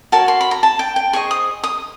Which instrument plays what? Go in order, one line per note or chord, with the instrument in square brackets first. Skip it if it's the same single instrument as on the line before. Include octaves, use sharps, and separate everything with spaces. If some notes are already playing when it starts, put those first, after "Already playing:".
[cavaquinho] F#4 A#4 C#5 A5
C6
B5
A#5
A5
G5
G5
G#4 C5 D#5 C#6
D#6
D#6